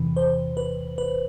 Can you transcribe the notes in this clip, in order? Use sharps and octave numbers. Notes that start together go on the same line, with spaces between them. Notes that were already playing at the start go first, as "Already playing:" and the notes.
Already playing: E2 C3 E3
C5
B4
B4